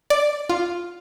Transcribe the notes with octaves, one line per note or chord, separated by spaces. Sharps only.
D5
F4